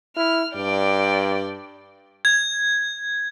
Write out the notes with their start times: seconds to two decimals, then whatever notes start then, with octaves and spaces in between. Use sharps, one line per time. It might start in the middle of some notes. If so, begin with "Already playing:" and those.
0.17 E4 F6
0.55 G2 D5 G5
2.25 G#6